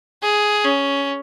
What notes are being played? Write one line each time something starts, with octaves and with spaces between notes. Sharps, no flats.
G#4
C#4